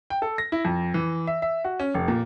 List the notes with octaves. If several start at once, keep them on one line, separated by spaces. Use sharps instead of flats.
G5
A4
A#6
E4
F2
E3
E5
E5
F#4
C#4
F1
A#2